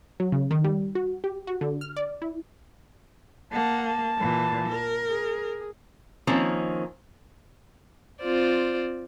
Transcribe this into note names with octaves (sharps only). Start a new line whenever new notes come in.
F#3
C#3
D#3
G3
F#4
G4
F#4
D3
F6
D5
E4
A#3 F#5 A5
A5
A#2 E3
A#4
G#4
D#3 F3 A#3 C4 C#4
C4 F4 C5 D5